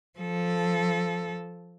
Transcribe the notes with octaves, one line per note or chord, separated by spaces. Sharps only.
F3 A4